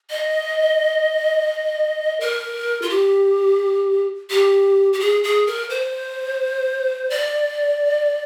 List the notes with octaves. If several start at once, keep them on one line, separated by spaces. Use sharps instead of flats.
D#5
A#4
F4
G4
G4
G4
G#4
G#4
A#4
C5
D5